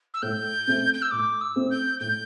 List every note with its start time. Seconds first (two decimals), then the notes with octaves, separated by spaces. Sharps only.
0.14 E6
0.22 A2 G6
0.67 A3 C4
0.94 G6
1.02 E6
1.11 A2 D6
1.41 E6
1.56 A3 C4
1.71 G6
2.00 A2 G6